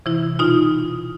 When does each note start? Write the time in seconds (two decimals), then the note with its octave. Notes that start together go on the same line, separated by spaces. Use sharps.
0.06 C3 E3 E4
0.39 B2 D#4 F4